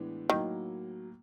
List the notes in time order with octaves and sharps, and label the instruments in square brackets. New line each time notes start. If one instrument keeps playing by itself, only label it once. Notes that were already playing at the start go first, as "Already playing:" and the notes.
Already playing: [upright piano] A2 E3 G#3 B3 D4
[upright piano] A2 F#3 A#3 [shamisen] D#3